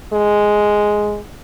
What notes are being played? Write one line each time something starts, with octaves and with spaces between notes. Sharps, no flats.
G#3